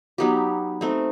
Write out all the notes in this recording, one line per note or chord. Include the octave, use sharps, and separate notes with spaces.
F#3 B3 D#4 G4
A3 C4 D#4